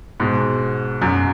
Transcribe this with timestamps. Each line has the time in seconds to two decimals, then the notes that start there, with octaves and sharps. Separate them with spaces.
0.20 G#2 B2
1.02 F#2